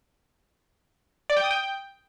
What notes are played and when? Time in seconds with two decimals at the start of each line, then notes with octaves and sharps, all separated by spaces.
1.30 D5
1.37 G5
1.44 D#6
1.51 G5